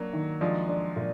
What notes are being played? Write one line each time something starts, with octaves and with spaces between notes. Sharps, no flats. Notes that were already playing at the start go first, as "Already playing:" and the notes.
Already playing: F#3 A#3 D4
D#3
F3 G#3 D4
D4
A#2